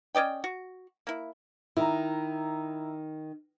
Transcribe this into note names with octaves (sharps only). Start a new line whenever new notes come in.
C#4 D5 D#5 G5
F#4
A#3 E4
D#3 E4 A#5